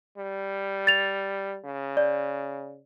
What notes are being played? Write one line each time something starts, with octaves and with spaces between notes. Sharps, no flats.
G3
A6 F7
C#3
D5